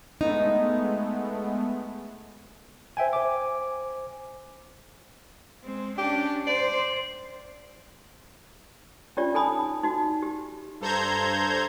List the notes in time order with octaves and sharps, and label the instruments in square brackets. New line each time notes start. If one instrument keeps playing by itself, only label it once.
[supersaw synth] G#3 A3 B3 [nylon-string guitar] D#4
[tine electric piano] C5 E5 G5 G#5
C5 G#5 D6
[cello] G#3 C4
[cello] C#4 D4 [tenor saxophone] G4
[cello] C5 [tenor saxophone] D5
[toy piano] C#4 D4 F4 G4 C#5 D5
D#4 A4 G#5 A5 B5 D#6
D#4 F#4
G4
[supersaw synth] G2 A4 C5 A#5 G6 G#6